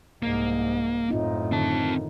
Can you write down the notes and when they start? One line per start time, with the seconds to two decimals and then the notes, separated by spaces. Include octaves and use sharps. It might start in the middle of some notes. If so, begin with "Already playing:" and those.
0.23 C2 G#2 A#3
1.08 F#2 A2 C4 D#4 F4
1.52 D3 D#3 C4 A5